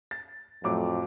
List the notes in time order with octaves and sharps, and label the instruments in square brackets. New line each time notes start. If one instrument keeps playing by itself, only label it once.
[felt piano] A6
[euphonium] F2 [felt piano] A2 F#3 D6